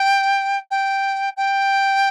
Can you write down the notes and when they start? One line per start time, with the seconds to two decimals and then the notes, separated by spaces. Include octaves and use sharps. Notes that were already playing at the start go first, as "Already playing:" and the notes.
Already playing: G5
0.71 G5
1.37 G5